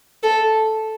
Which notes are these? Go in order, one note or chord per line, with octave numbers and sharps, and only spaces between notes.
A4